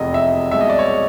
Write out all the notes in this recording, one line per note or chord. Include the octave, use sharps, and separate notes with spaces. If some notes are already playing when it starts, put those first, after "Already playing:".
Already playing: F1 E2 C3 D#5
E5
C2 B2 G#3 E5
D#5
D5
C#5